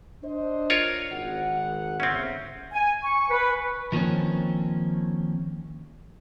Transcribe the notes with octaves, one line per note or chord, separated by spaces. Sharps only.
D4 C5 D#5
F4 A#4 C#5
G#1 F#5
G1 C#3 C4 C#4 E5
G#5
C#6
B4
D#3 F3 A#3 C4 C#4